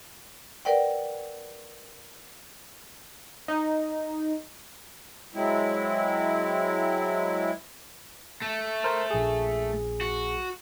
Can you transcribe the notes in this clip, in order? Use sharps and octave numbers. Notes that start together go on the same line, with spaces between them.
A#4 B4 D5 F#5 G5
D#4
F#3 G#3 C4 E4
A3
A#4 C5
A#1 G#4
F#4